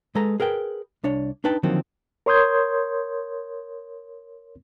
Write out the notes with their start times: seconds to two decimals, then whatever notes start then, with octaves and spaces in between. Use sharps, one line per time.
0.15 G#3 A4 B4 A#5
0.40 G#4 A#4 B4 G5
1.04 C2 D4 C#5
1.44 D4 D#4 B4 G5 A5
1.63 D3 D#3 F3 F#3 A#3 C4
2.26 A#4 C#5 C6 D#6 G6 G#6